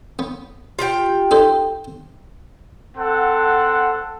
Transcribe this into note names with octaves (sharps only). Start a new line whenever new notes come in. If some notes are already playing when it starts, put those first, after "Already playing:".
B3
F4 G4 G5
D#4 A4 C5
C4 A4 F#5